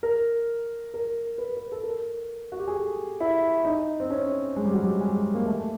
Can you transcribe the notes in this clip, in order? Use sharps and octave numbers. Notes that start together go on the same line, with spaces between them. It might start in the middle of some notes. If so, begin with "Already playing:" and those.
A#4
A#4
B4
B4
A4
A#4
F#4
G4
G#4
A4
E4
D#4
C4
C#4
G#3
G3
F#3
G3
G#3
A#3
A3